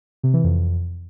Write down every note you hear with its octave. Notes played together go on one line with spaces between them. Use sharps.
C3
E3
F2